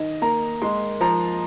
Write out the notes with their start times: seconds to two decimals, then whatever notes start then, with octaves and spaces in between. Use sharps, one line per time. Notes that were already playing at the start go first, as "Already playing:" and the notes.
Already playing: D#3 D#5
0.22 A#3 A#5
0.62 G#3 C6
1.01 F3 A#5